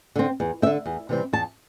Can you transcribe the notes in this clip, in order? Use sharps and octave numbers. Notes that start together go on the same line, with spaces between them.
D3 C4
E2
C4 E5
D3
E2
C3 E3 G3 C4
E2 A5